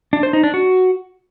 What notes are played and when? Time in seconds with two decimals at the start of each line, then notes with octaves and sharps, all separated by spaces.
0.13 D4
0.23 C5
0.33 D#4
0.44 D4
0.54 F#4